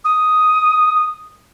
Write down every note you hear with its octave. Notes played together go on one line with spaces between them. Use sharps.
D#6